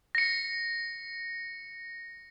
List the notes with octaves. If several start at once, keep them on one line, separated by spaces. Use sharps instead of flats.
A#6 C#7